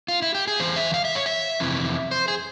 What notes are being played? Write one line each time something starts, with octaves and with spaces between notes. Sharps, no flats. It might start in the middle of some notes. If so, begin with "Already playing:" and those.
F4
E4
G4
G#4
E2 E3 C5
E5
F5
E5
C#5
E5
F2 C3 E3
C5
G#4